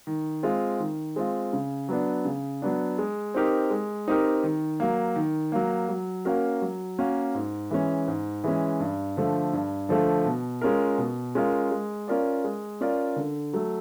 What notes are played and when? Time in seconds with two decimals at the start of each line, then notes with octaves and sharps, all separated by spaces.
0.07 D#3
0.43 G#3 C4 F4
0.80 D#3
1.16 G#3 C4 F4
1.53 C#3
1.89 F#3 B3 D4
2.25 C#3
2.62 F#3 B3 D4
2.98 G#3
3.34 C4 D#4 G4 A#4
3.70 G#3
4.08 C4 D#4 G4 A#4
4.43 D#3
4.80 F#3 A#3
5.16 D#3
5.52 F#3 A#3
5.89 F#3
6.25 A#3 C#4 F#4 A#4
6.62 F#3
6.99 A#3 C#4 F#4 A#4
7.34 G#2
7.71 E3 G#3 C#4
8.08 G#2
8.44 E3 G#3 C#4
8.80 G2
9.17 D3 F3 A3
9.53 G2
9.89 D3 F3 A3
10.26 B2
10.61 G#3 C#4 F4 A#4
10.98 B2
11.35 G#3 C#4 F4 A#4
11.71 G#3
12.08 C#4 F4 A#4 D5
12.44 G#3
12.81 C#4 F4 A#4 D5
13.16 D3
13.53 F#3 A3